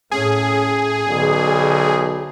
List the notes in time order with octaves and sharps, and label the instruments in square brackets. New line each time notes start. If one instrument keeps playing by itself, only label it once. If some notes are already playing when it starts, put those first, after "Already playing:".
[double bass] A2 C#4 [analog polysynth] G#4
[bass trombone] B1 [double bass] D3